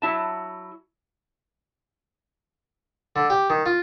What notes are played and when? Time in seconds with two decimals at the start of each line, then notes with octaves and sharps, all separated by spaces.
0.02 F#3 E4 A5
3.16 D3
3.30 G4
3.50 D#3
3.66 F4